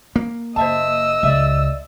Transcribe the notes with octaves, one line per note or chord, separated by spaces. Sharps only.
A#3
F#1 C5 D#5 E5 A5 E6
C#2 D5 E5